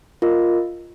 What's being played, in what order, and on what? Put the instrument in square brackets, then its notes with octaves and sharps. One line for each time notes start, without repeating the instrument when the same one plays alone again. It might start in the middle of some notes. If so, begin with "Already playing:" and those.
[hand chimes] F4 A#4 D#5